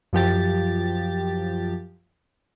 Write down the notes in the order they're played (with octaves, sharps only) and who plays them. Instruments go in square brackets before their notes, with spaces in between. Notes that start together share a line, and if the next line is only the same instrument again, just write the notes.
[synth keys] F#2 F3 G4 A6